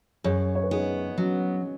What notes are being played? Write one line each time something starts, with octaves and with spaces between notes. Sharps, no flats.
F#2 G#4 C#5
C#5
B4
B3 D#4 G#4
F#3 C#4 F#4